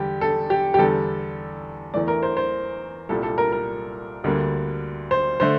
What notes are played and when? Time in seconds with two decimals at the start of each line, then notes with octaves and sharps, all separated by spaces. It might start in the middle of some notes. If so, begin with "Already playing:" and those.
Already playing: E2 D3 G3 G4
0.21 A4
0.50 G4
0.74 G4
0.78 E2 D3 G3 A4
1.94 E2 E3 A3 D5
2.08 A#4
2.23 C5
2.37 C5
3.09 C2 A#2 G3 A4
3.23 A4
3.38 A#4
3.52 A#4
4.24 D2 D3 G3 A#3
5.11 C5
5.40 D3 A3 C5